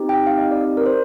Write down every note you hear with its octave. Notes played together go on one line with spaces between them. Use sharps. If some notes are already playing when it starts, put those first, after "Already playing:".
Already playing: C4 D#4 G4
G5
F5
D#5
D5
D5
A#4
C5